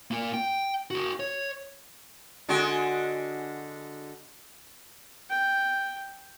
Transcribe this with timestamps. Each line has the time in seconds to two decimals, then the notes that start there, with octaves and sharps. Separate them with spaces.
0.11 A#3 F4
0.34 G5
0.91 F#4 G#4
1.20 C#5
2.49 D3 G#3 F#4
5.29 G5